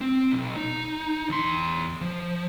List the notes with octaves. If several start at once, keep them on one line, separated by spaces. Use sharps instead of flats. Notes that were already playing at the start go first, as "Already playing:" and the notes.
C4
B1
D#4
E2 C6
F3